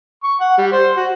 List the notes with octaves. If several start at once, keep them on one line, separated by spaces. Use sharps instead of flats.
C#6
F#5
G3
C5
F#4